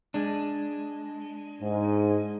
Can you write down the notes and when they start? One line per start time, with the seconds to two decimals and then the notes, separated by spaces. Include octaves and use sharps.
0.14 G#3 D4
1.62 G#2